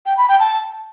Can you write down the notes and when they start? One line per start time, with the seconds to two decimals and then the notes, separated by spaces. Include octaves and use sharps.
0.06 G5
0.17 B5
0.29 G5
0.40 A5